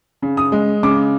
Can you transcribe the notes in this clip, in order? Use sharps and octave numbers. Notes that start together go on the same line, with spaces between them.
C#3
D#6
G#3
C#3 D6